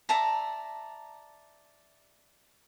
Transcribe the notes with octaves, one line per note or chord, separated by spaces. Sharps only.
D5 E5 A5 A#5